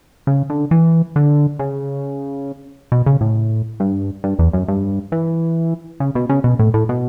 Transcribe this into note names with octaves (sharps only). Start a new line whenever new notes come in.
C#3
D3
E3
D3
C#3
B2
C#3
A2
G2
G2
E2
F#2
G2
E3
C#3
B2
C#3
B2
A2
A2
B2